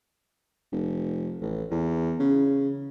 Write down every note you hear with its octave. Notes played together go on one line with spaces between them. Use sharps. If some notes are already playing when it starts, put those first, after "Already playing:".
F1
A1
E2
C#3